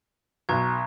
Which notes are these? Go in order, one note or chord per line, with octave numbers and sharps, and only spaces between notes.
B1 A#5 C#6 G#6